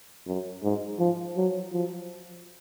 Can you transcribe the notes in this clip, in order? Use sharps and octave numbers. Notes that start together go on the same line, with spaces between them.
F#2
G#2
F3
F#3
F3